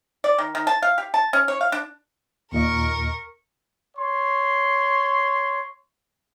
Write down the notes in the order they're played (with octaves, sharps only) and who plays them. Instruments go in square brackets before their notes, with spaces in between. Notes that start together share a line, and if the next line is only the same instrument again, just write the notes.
[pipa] D5
D#3
D#3
A5
F5
G4
A5
C#4
C#5
F5
D4
[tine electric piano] D#2 A#2 D#5 [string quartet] A#4 C#6
[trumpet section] C#5 C6